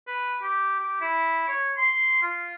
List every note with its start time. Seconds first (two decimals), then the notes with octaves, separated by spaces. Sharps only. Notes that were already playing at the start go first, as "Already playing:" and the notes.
0.07 B4
0.42 G4
0.79 G4
1.01 E4
1.48 C#5
1.77 C6
2.23 F4